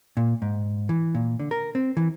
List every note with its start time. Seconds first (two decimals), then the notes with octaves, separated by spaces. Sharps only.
0.17 A#2
0.42 G#2
0.89 E3
1.15 A#2
1.40 D3
1.51 A#4
1.75 C4
1.97 E3